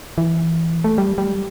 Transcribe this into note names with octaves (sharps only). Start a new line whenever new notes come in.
E3
A3
G3
G3